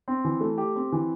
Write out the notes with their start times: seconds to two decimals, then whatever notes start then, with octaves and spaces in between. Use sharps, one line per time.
0.08 C4
0.24 E3
0.41 A3
0.58 G4
0.76 C4
0.92 E3